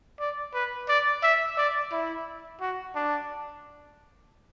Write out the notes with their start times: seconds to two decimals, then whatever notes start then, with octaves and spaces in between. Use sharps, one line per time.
0.20 D5
0.54 B4
0.88 D5
1.23 E5
1.57 D5
1.92 E4
2.61 F#4
2.96 D4